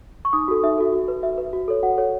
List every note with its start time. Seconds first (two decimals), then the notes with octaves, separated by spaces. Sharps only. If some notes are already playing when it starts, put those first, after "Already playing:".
0.25 C#6
0.33 D#4 D#6
0.48 F#4 A4
0.63 D#4 E5
0.78 F#4 A4
0.93 F#4
1.08 B4
1.23 F#4 E5
1.38 B4
1.53 F#4
1.68 A4 C#5
1.83 F#4 F#5
1.98 A4 C#5